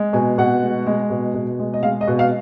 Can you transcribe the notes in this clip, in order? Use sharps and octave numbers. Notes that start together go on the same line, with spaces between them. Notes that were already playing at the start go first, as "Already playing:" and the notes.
Already playing: G#3
B2 G#5
B2 F#5
G#3
G#3
B2
B2
G#3
D#5
G#3 F5
D#5
B2
F5